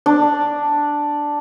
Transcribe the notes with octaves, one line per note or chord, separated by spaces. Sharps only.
D4